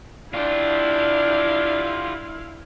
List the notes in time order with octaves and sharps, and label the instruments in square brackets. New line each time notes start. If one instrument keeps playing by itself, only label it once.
[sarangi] D4 [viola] E4 F5 [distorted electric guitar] F4 G4